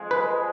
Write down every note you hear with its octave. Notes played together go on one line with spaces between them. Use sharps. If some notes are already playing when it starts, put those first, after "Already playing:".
Already playing: F2 F3 G#3
B4